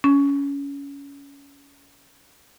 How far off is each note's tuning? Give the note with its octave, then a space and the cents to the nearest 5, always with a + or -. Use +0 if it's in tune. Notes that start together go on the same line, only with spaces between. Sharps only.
C#4 +20